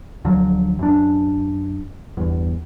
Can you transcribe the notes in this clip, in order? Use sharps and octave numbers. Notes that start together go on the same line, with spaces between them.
D2 D3 F3 F#3
F#2 D4
G1 E2